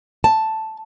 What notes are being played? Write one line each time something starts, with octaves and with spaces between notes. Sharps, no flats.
A5